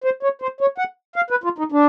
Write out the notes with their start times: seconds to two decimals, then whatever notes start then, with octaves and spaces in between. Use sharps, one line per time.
0.04 C5
0.23 C#5
0.42 C5
0.61 C#5
0.78 F#5
1.16 F5
1.30 B4
1.44 F4
1.58 D#4
1.72 D4